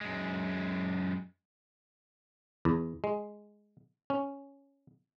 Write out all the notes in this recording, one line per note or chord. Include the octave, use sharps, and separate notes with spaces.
F#2 G#3
E2
G#3
C#4